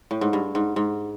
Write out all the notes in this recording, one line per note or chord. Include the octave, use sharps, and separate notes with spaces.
A2
G#2
G2
G#2
G#2